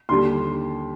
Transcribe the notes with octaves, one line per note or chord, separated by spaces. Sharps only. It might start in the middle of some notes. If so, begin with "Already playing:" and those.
D#2 D3 G3 C6